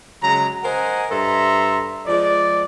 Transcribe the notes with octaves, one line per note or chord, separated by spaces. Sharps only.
C#3 F#3 G#3 A#5
A#4 C5 D#5 F#5 G#5
G2 A4 E5 A#5 C6
F3 G#3 D5